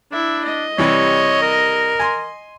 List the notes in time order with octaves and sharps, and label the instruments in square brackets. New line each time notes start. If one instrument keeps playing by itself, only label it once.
[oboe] D4 [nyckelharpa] E4 E5
[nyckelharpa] D#5
[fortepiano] C3 E3 G3 [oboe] C#5
[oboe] A#4
[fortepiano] G#5 C6